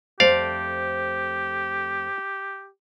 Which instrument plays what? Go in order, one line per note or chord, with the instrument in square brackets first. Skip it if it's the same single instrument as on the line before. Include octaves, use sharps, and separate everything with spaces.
[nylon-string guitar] F2 A3 C5 [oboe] G4 [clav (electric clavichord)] D5 F5